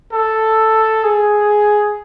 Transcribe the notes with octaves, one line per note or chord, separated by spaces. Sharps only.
A4
G#4